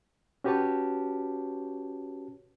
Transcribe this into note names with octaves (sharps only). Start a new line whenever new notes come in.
C#4 F#4 G4 B4 C#5 A5